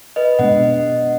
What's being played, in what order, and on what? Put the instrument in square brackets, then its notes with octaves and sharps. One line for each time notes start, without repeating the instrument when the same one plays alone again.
[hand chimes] B4 D#5
[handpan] B2 G#3 B3 D4 [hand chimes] D#5 F#5